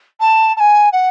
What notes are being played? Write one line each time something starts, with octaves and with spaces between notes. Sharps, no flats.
A5
A5
G#5
F#5